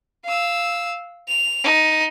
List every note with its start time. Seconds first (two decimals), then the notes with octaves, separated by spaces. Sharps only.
0.25 F5 E6
1.28 F7
1.63 D#4